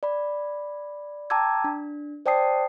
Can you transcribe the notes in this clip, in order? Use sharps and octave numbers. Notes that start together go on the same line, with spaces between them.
D5 B5
G5 A5 A#5 D6 E6 G#6
D4
C5 D5 G5 A5 D#6 C7